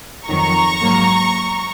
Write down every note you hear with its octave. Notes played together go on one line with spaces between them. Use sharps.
F2 D#3 F#3 A#5 C#6
G#2 F#3 A#3